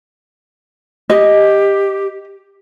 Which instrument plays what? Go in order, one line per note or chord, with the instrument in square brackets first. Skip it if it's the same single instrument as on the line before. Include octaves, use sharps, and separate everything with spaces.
[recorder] G4 [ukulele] D#5